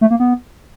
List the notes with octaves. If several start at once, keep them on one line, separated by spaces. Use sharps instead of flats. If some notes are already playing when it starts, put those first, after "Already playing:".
A3
A#3
B3